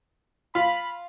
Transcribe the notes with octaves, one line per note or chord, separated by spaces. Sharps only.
F4 B5